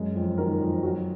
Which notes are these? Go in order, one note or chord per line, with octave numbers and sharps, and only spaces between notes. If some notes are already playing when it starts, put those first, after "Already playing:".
Already playing: F#2 G#3
F2
D#3 F#4 A#4
F2
F#3 F#4